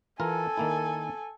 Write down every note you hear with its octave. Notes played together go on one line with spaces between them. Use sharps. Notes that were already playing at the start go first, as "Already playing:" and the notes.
E3 F4 A4 A#4 G#5
D#3 A#3 E4